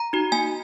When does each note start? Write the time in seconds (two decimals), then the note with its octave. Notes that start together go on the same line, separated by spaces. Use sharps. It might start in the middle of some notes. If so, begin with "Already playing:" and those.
Already playing: A#5
0.13 D#4 F#4
0.32 A#3 G#5